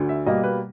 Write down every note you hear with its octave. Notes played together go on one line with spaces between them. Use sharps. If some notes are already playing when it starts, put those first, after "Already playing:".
Already playing: D2 D3
E5
B2 G3 A#3 D#5
B4